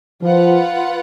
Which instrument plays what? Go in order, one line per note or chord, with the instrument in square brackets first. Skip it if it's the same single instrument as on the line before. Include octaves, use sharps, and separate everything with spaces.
[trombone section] F3 [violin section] F4 B4 F#5